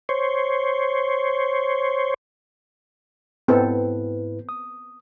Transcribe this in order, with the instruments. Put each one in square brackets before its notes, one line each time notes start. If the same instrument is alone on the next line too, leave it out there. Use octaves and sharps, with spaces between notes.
[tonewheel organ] C5 C#5
[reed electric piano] G#2 E4 B4 [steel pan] B3 C4 A4
[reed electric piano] D#6